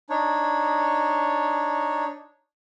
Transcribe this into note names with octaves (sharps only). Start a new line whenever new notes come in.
D4 D#4 C#5